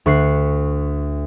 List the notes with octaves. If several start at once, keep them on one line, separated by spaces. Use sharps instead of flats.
D2 C#6 F#6 C7